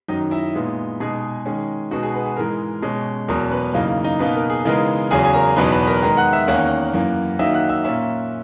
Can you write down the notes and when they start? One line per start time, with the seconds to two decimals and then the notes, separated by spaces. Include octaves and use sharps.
0.08 F#2 D#3 F#3 D#4 D#5
0.31 E4 E5
0.55 A#2 G#3 B3 D#4
1.00 B2 G#3 D#4 G#4 G#5
1.45 D#3 G#3 C#4
1.91 B2 G#3 B3 D#4 F#4 F#5
2.03 G#4
2.14 B3 B4
2.26 G#4
2.37 G#2 E3 G#3 A#4
2.82 B2 G#3 C#4
3.28 E2 B2 F#3 A#4
3.51 B3 B4
3.74 F#2 C#3 E3 A#3 D#4
4.04 D#4 D#5
4.19 B2 A#3 B3 D#4 B4
4.35 A#4
4.50 G#4
4.65 C#3 E3 G#3 B3 D#4 A#4
5.11 E2 C#3 F#3 C#4 G#4 G#5
5.25 G#5
5.34 A#4 A#5
5.56 E2 B2 F#3 B3 D#4 B4 B5
5.72 B4 B5
5.82 B5
5.87 A#4 A#5
6.03 D#3 G#3 B3 D#4 A#4 A#5
6.17 F#5 F#6
6.33 E5 E6
6.48 E2 D#3 A#3 C#4 F#5 F#6
6.94 F#2 E3 A#3
7.39 D#3 F#3 A#3 D#4 E5 E6
7.54 F#5 F#6
7.69 E5 E6
7.84 A#2 A#3 C#4 E5 E6